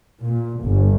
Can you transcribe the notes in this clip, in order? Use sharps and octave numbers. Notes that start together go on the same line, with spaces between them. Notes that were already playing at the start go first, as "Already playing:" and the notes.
A#2
G1